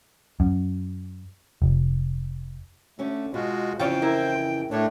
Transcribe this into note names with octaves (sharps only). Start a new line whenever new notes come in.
F#2
F1
D3 A3 C#4
B2 G#3 F4 F#4
F2 C#3 E3 F4 C5 C#5 G5
E4 A#4
A2 A3 D4 C#5